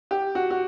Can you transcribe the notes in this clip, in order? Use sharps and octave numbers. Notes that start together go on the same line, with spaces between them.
G4
F#4
F#4